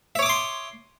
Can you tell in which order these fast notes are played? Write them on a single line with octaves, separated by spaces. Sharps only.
E5 C#5 D6 D#6 C6